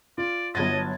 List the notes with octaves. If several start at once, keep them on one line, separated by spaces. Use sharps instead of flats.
F4 D5
G1 F#3 B3 D4 D#5 G#6 A6